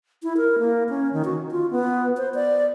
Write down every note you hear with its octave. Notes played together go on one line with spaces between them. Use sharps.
E4
A#4
A#3
C#4
D#3
F#4
F4
B3
C5
D5